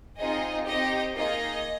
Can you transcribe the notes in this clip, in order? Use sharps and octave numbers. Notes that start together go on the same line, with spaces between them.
C4 D#4 F4 G#4 D#5
C4 D#4 G4 D#5
A#3 D#4 F4 G#4 D#5